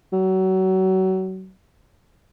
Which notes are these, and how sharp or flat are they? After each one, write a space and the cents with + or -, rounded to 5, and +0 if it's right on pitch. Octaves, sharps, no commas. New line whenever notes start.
F#3 +30